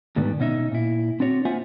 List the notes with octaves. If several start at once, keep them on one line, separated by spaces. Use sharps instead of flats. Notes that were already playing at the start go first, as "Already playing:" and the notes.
D2 G#2 D3 D#3 G3 B3
B2 C#4 D#4 E5
A#2 E4
C4 D4 F#4 C#5
A#3 F4 C5 E5 F#5 G#5